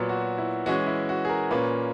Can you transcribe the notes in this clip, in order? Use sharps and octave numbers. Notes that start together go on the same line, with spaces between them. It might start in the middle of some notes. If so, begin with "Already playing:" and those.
Already playing: A#2 F#3 B3
F#4
E4
E3 G#3 C#4 F#4
E4
F#4
G#4
A#4
A#2 A#3 C#4 B4